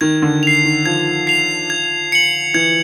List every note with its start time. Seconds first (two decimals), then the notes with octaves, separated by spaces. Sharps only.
0.01 D#3 G#6
0.22 D3
0.43 C7 F7
0.65 D#3
0.86 F3 G#6
1.27 C7 F7
1.70 G#6
2.12 C#7 F#7
2.54 E3 G#6